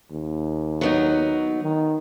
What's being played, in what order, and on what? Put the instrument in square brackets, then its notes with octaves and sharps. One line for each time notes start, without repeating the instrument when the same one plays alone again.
[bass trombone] D#2
[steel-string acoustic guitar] F#3 B3 D#4
[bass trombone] D#3